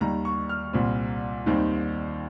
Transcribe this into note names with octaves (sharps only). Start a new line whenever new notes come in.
D#2 D#3 G3 A#5
C#6
F6
C2 A#2 G3 C4
D#2 D#3 G3 C4 D#4